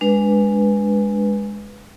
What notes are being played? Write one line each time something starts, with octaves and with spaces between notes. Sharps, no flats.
G#3 D4 B4